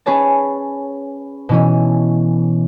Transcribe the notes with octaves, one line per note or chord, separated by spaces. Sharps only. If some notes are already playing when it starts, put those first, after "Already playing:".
C#4 G#4 B4 C#5 A5
B2 E3 C#4